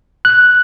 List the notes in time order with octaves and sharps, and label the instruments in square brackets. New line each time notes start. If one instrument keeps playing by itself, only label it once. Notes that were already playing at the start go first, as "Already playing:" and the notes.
[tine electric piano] F#6